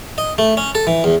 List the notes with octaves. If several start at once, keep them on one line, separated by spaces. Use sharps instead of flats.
D#5
A3
C#4
A4
E3
E2